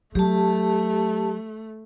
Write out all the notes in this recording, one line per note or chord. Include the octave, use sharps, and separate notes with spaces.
F#3 A3 G4 A5